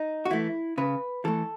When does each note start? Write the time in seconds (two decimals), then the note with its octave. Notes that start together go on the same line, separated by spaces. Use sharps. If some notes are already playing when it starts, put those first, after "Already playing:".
Already playing: D#4
0.25 F#4
0.30 E3 A3 E4
0.78 C#3 B4
1.25 E3 A3 A4